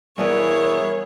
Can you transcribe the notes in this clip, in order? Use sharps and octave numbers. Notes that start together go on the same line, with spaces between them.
G2 B2 E3 B3 E4 G#4 A#4 C#5